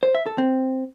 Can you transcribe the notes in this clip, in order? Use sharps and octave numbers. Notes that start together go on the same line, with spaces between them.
C5
E5
A4
C4